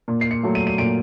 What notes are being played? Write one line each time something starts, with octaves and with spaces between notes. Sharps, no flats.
A#2
C7
C#7
F#3 A3
D#7
D#7
A#2 D7